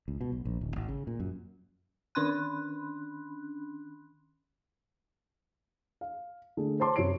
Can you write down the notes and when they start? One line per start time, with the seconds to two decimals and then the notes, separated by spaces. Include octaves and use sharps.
0.08 C#2
0.21 B2
0.32 B1
0.45 A#1
0.61 D1
0.76 G#1
0.88 C#3
1.07 A#2
1.20 F#2
2.15 D#3 C#4 D4 B5 C6 F#6
6.01 F5
6.57 D3 A3 G#4
6.80 C5 C#5 A5 C6 D6
6.96 F#2 C3 E4 C#5 C7 D7